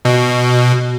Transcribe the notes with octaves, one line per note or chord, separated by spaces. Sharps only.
B2